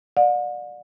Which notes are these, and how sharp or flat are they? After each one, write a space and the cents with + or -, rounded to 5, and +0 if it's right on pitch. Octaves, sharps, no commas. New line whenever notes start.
D5 +25 F#5 -45